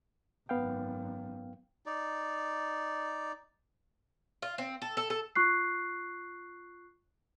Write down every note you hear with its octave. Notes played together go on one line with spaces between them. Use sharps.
G#1 F#2 B3 F5 G5
D#4 D5
F4
C4
A4
A4
A4
F4 C#6 F#6 C7